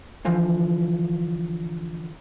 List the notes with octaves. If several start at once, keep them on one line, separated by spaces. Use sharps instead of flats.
D3 E3 F3